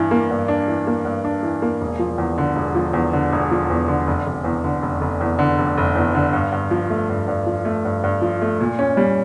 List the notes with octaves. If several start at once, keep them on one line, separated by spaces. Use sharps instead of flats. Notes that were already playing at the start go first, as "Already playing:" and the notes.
Already playing: G2 E3 D4
A#3
G2
D4
E3
A#3
G2
D4
E3
A#3
E1
F3
E2
D3
E1
F3
E2
D3
E1
F3
E2
D3
F1
F1
E2
D3
F1
F1
E2
D3
F1
F1
E2
D3
G2
G2
F3
A3
G2
G2
F3
A3
G2
G2
F3
A3
A#2
C#4
G3